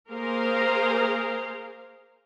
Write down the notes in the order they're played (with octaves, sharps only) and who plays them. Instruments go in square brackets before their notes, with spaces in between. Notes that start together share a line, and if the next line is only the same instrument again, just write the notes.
[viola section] A#3 G#4 A#4 C5 F5 A#5